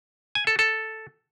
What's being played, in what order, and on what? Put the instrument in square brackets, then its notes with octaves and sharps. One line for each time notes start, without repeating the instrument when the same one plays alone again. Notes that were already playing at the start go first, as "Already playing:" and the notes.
[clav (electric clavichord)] G#5
A4
A4